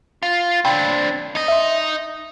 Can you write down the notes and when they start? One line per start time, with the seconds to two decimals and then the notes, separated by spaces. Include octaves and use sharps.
0.23 F4
0.65 C4 D4 G5 B5 C6
1.35 D#4 D#5
1.48 E5 C6